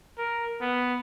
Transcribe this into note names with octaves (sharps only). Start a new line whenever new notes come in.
A#4
B3